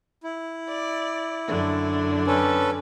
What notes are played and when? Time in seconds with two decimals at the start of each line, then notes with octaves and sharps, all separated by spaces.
0.23 E4
0.67 D5
1.47 F#2 D3 D4
2.27 C#4 A4 B4